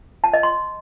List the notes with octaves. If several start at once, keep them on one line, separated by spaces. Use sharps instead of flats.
A5
D#5
C6